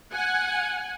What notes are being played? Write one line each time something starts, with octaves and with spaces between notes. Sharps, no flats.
F#5 G#5